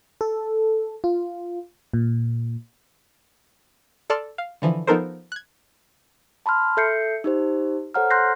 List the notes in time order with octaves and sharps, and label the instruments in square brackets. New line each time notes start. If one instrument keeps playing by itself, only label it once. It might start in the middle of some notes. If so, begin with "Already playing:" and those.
[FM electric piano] A4
F4
A#2
[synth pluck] A4 D5 A5 C6 F6
F5
D3 E3 F3
F3 B3 D#4 A4 A#4 C5
F#6 G#6
[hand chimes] A5 B5 C6 F6
A4 E5 G6 C7 C#7
D#4 G4 C5
A4 C5 C#5 F#5 A#5 F6
C6 F#6 G6 A#6 C7